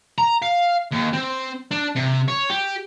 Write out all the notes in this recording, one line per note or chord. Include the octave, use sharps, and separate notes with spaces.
A#5
F5
D#2
C4
D4
C3
C#5
G4